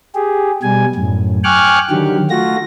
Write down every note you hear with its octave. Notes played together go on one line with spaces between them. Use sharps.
G4 G#4
B2 G3 G#5
F#2 A2
G5 G#5 C#6 D6 F6 F#6
D3 D#3 F#3 G4
A3 F4 F#4 A#6